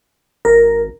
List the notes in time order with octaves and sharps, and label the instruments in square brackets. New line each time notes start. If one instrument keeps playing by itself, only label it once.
[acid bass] G#1 [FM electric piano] A#4